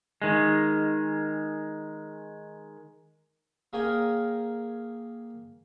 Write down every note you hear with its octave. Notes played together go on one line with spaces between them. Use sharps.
D#3 G#3
A#3 G#4 A#4 C#5 G5 G#5